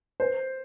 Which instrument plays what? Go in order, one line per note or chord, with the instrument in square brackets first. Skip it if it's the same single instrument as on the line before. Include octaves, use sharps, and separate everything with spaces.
[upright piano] C5